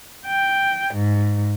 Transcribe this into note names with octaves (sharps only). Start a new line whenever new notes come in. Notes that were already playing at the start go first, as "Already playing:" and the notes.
G5
G#2